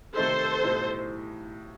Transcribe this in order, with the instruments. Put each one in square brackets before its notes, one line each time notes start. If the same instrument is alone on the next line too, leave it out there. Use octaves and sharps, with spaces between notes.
[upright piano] C3 D#3 A3 C4 D#4 [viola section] A4 C5
[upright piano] B1 A2 G3 D#4